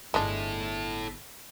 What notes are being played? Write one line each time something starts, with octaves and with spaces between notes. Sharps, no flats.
G1 G#3 B3 D4 E4 A4